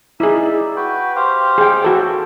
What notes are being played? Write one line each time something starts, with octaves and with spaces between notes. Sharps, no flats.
D#4 E4 G#4 D5 E5
F#4 B4 G5
G4 C5 F5
G#4 G5
F#4 A4 G5